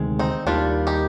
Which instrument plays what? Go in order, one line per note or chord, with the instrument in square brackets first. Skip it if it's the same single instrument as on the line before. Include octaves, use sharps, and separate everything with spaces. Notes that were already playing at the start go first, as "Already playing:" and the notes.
Already playing: [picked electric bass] D2 C3 D#3 G#3
[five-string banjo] C4 D#4
[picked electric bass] D#2 D#3 G3 [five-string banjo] D4 F4
[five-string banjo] D#4 G4